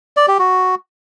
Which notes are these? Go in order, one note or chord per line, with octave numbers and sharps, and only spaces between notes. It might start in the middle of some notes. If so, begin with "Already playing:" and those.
D5
G4
F#4